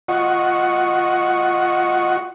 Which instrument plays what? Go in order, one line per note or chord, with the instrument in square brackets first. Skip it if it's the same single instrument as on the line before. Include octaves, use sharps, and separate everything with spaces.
[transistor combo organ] F4 D#5 F#5 C#6